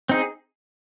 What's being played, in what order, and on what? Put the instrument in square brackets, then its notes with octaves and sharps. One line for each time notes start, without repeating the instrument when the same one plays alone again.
[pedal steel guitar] C4 D#4 G#4